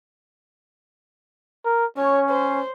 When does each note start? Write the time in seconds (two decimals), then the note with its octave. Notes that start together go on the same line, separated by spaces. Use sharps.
1.65 A#4
1.97 C#4 C#5
2.30 C5